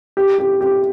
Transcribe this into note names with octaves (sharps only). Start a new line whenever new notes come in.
G4
G4
G4